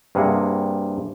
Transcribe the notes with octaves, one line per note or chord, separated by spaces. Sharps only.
G2 C3 A#3 G#4 F#5